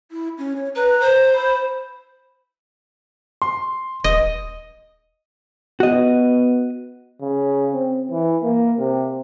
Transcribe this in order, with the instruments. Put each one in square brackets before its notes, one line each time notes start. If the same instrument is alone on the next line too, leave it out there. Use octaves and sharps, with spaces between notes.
[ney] E4
C#4
C#5
[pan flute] B4 [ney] A#5
[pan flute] C5
[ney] B5
[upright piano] C6
[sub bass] D#1 [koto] D#5
[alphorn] B3 [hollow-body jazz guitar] F#4 D#5
[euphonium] C#3
C4
E3
A#3
C3